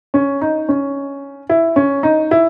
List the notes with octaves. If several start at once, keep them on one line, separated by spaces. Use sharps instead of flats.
C#4
D#4
C#4
E4
C#4
D#4
E4